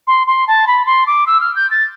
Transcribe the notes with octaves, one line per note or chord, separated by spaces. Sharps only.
C6
C6
A5
B5
C6
D6
E6
F6
G6
A6